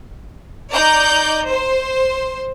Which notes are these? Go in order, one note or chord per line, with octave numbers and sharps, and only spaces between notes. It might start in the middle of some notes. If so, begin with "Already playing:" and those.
D#4 D5 A#5 G6
C5